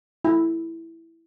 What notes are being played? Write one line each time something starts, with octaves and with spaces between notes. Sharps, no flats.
E4